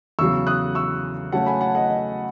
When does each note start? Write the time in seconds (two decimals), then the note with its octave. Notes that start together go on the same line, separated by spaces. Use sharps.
0.19 E2 C#3 F#3 C#6 E6
0.47 D#6 F#6
0.75 C#6 E6
1.32 C#3 F#3 A3 C#4 F#5 A5
1.46 G#5 B5
1.61 F#5 A5
1.75 D#5 F#5
1.90 D#5